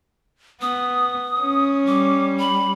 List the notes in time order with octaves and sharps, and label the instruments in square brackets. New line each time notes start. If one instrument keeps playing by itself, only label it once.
[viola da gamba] B3 [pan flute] D#6
[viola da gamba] C#4
[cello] G3 [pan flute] D6
[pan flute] B5